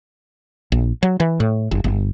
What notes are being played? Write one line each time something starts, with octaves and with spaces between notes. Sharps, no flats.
A#1
F#3
E3
A2
F#1
G1